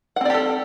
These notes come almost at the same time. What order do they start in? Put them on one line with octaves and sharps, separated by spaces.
F#5 C4 D5 G4 A4